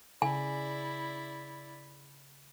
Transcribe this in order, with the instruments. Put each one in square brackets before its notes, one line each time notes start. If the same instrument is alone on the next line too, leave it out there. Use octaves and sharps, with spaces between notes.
[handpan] C#3 [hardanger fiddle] E4 D5 [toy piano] G#5